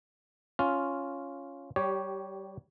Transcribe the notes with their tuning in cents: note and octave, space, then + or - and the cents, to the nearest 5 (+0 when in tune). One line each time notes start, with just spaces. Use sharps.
C#4 +0 F4 +0
G3 -25 G4 -5 C#5 +5